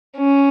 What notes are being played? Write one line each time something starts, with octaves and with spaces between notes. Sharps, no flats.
C#4